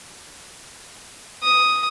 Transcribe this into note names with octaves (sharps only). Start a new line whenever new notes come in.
D#6